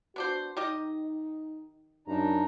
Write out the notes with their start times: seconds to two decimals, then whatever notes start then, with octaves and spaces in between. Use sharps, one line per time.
0.16 B3 D4 F#4 C5
0.57 D#3 D#4 G4 D#5
2.08 F#2 D4 D#4 A#5